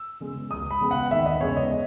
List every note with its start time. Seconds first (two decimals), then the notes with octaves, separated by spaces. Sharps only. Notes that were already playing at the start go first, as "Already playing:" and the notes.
Already playing: E6
0.20 C#3 G#3 B3
0.51 C#2 D#6
0.71 B5
0.81 C#3 G#3 B3
0.91 F#5
1.11 D#2 E5
1.26 D#5
1.41 C#3 G#3 B3 C#5
1.56 D#5